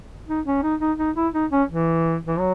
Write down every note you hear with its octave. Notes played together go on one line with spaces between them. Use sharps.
D#4
C#4
D#4
D#4
D#4
E4
D#4
C#4
E3
E3
F#3